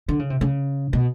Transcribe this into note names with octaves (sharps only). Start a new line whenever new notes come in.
D3
C#3
C3
C#3
B2